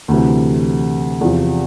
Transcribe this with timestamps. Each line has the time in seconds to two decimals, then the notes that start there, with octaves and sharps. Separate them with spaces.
0.08 D2 C3 E3
1.21 E2 C3 F3